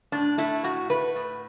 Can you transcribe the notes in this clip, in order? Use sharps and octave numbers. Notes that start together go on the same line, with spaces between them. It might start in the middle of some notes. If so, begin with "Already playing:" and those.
A2 D4
A3 E4
A2 F#4
A3 B4
A2